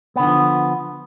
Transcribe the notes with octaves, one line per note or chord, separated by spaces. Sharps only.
D3 E3 F3 B3